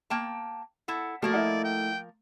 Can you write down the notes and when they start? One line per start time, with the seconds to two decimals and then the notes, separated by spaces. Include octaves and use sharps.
0.10 A#3 G5 A5
0.88 E4 A4 F#5
1.22 F3 A3 A#3 F#4 A#4 D5 G5
1.34 E4 D#5 F#5
1.64 G5